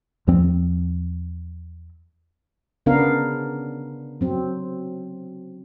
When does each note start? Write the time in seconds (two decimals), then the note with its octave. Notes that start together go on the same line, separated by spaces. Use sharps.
0.27 E2 F3 C4
2.86 C#3 B3 D4 A#4 F5
4.21 F#3 C4